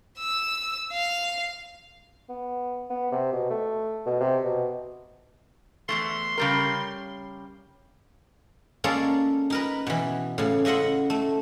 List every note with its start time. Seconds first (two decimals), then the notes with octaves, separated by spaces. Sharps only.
0.18 E6
0.92 F5
2.29 B3
2.90 B3
3.12 C3
3.33 B2
3.50 A3
4.06 B2
4.20 C3
4.45 B2
5.89 E2 G#2 A3 C6
6.38 C#3 G3 A#4
8.84 G#3 A#3 C#4 A4 D5
9.50 D#4 A#4 B4
9.87 B2 E3
10.38 A2 C#3
10.65 C#3 D#5 E5 F#5 C6
11.10 A3